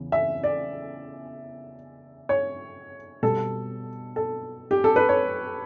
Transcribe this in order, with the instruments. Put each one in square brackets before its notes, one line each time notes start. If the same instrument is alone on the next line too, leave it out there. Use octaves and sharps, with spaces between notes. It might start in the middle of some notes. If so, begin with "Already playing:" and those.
Already playing: [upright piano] E2 C#3 E3
E5
D5
C#5
B2 G3 A4
A4
G4
A4
B4
C#5